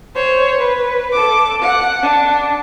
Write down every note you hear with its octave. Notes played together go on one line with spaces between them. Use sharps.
C5 C#5
B4
A4 D6
F#5
D4